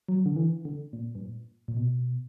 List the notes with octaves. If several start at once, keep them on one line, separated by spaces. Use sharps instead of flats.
F#3
D3
E3
D3
A#2
G2
A#2
A#2
B2